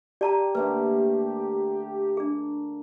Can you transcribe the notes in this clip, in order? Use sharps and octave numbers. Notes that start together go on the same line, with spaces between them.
G4 D5 A5 A#5
D3 A3 A#3 B4
D4 G#4